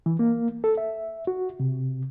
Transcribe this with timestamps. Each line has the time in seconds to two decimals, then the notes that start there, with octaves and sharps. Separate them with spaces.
0.06 E3
0.19 A#3
0.64 A4
0.78 E5
1.27 F#4
1.60 C3